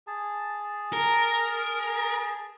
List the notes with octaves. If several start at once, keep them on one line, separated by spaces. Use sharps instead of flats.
G#4 A5
A#4